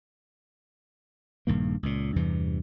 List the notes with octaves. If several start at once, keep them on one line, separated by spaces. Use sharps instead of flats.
A#1 G2 D#3 A#3
C#2 A#2
E2 G2 C3 E3